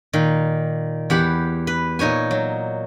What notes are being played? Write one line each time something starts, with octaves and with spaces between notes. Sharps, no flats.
A#2 D#3
E2 G4 F#5 B5
B4
A#2 D#4 C#5 G#5
F#3